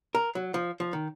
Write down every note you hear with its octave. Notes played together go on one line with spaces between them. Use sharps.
A#4
F#3
F3
F3
D#3